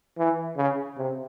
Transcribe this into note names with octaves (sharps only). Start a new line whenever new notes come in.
E3
C#3
C3